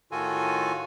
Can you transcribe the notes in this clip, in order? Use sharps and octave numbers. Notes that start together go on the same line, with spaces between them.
A2 D#3 F4 F#4 A4 G#5